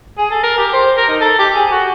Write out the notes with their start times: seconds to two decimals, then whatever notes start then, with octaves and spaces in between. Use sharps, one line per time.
0.18 G#4
0.31 A4
0.43 A#4
0.58 G4
0.73 C5
0.97 A#4
1.08 D#4
1.21 A4
1.39 G4
1.55 G#4
1.71 F#4